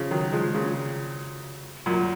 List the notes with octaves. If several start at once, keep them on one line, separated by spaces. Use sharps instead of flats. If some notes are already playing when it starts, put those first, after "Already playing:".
Already playing: C#3 F3
D#3 F#3
F3 G#3
A#2 C#3
F#2 A#2